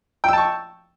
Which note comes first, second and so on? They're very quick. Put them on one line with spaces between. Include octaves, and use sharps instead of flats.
G5 E6 A5 C#6